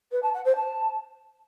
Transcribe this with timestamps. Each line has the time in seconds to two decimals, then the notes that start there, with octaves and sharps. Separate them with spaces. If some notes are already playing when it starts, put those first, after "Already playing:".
0.11 B4
0.22 A5
0.33 F#5
0.44 C5
0.56 A5